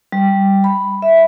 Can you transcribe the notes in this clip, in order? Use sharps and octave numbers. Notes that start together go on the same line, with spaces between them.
G3
B5
E5